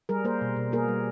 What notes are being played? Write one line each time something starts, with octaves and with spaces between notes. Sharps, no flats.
G3 G#4 A#4
A#3 A#4 C5
B2
B2
A#3 G#4 A#4
G3